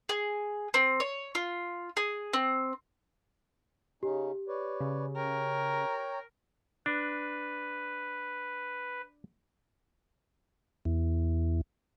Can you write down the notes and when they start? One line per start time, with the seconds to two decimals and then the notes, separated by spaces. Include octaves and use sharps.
0.09 G#4
0.74 C4
1.00 C#5
1.35 F4
1.97 G#4
2.33 C4
4.03 C#3 C#4 D#4 G4
4.48 B4 C#5 D5
4.81 C#3
5.16 A#4 C#5 G5
6.86 D4 B4
10.85 E2